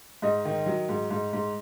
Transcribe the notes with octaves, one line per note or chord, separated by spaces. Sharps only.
G#2 D#5
D#3
F#3
G#2
G#2
G#2